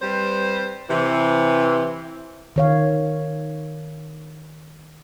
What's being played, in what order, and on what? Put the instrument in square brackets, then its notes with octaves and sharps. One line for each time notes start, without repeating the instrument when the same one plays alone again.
[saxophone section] G3 C4 B4 C5
C3 E3
[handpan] D#3 C#5 F5